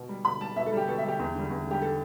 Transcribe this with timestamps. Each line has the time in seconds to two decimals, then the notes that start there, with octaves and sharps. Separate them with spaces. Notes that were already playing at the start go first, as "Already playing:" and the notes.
Already playing: B2
0.09 G3
0.25 B2 B5
0.41 G3 A5
0.56 B2 E5
0.66 A4
0.72 G3 G4
0.88 B2 A4
0.98 E5
1.03 G3
1.08 G4
1.19 E2
1.35 D3 G3
1.51 E2
1.66 D3 G3 G4
1.82 A4